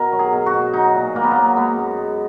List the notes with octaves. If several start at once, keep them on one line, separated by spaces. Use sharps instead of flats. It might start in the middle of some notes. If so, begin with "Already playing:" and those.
Already playing: B2 A#4
F#3
G#4
B2
F#4
B2
F#3 D#4
A#2
A#2 A#3
B3
F#3 A#3
G#3 B3
F#2
G#3